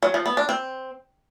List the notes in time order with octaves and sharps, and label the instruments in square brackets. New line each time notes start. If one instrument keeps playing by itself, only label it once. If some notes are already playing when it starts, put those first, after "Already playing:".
[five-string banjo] F#3
F3
B3
D4
C4